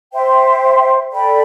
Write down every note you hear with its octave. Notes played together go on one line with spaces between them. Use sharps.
C5 E5 G5 C6
A4 D5 G5 B5